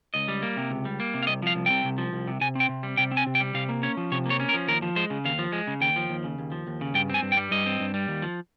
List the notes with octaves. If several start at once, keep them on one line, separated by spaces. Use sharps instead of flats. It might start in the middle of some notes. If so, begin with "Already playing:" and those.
C#2 D#5
G3
A#3
C3
C#2
G3
A#3
C3
F5
C2 D#5
F3 F5
C2
C3 G5
C2
F3
C2
C3
C3 G#5
C4 G5
C3
G3
C3 G5
C4
G#5
C3
G5
G3
C3 F5
A#3
C#4 C#5
F3
C3 C#5
A#3 C#5
C#4
A#4
F3
D#2 A#4
F3
G#3 C5
C#3
D#2 F5
F3
G#3
C#3
D#2 G5
F3
D#2
C#3
D#2
F3
D#2
C#3
G2 G5
C4 G#5
G2
G5
G3
G2 D#5
C4
G2
G3
D#2
F3